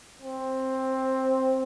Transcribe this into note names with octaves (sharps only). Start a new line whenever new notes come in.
C4